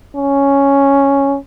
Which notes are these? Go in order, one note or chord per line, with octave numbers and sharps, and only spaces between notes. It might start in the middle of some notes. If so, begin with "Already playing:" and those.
C#4